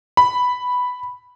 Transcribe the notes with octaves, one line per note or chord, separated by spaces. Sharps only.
B5